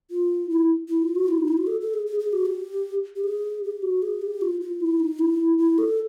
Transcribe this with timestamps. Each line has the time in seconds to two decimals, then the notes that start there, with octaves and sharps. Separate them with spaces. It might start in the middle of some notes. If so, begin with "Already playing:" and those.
0.11 F4
0.50 E4
0.89 E4
1.02 F4
1.15 F#4
1.29 E4
1.38 D#4
1.48 E4
1.57 F#4
1.67 A4
1.81 A4
1.94 G#4
2.06 G#4
2.19 G#4
2.33 F#4
2.46 G4
3.16 G4
3.24 G#4
3.63 G4
3.82 F#4
4.02 G#4
4.22 G4
4.41 F4
4.61 F4
4.80 E4
5.00 D#4
5.19 E4
5.58 E4
5.78 A4